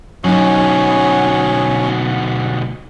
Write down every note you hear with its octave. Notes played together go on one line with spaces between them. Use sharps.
D2 B2 F#3 C#4 D#4